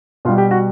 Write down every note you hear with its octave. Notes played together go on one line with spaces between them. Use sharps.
B2 G3 F4
G4
F#4